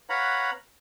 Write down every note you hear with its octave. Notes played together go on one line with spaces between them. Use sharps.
B4 C#5 F5 F#5 A#5 B5